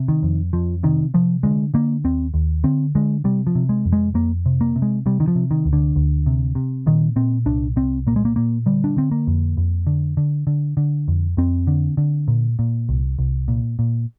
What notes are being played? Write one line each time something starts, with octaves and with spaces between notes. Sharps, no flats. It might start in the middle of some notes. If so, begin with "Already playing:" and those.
Already playing: C3
D#3
F2
F2 F3
C3 D#3
C3 F3
D3 G#3
D3 A#3
D#2 C4
D#2
D3 C4
D3 G#3
C3 G3
F3
C3
G#3
F2
G#3
F2 A#3
C3
A#3
C3
G#3
C3 G3
D#3
F3
C3
D#3
D2
D3
D2
C3
C3
A#2 D#3
A#2 C4
C2 D4
C2 C4
A#2 A#3
G#3
A#3
A#2 A#3
D3 G3
D4
D3 C4
A#3
F2
F2
D3
D3
D3
D3
F2
F2 C4
D3
D3
A#2
A#2
C2
C2
A#2
A#2